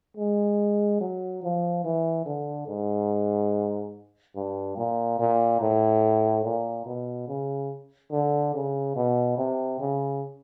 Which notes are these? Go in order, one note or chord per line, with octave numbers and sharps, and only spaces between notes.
G#3
F#3
F3
E3
D3
G#2
G2
A#2
A#2
A2
A#2
B2
C#3
D3
C#3
B2
C3
C#3